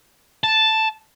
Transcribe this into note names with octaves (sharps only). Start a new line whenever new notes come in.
A5